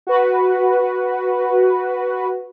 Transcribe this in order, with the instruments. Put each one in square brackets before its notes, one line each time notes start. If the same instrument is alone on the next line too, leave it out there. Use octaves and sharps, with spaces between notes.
[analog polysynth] F#4 B4